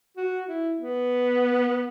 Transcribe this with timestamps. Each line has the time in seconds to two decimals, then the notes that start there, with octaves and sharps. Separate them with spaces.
0.17 F#4
0.49 E4
0.80 B3